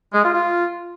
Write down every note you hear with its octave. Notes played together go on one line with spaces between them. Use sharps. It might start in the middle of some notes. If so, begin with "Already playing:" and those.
G#3
F4
F4